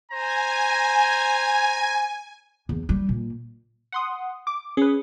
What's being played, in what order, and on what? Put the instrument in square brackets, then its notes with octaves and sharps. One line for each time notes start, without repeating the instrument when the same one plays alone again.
[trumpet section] C5 A#5 [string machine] G#5
[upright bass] E2
G3
A#2
[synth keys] F#5 C6 D#6
D6
[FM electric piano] C#4 [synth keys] G#4 B4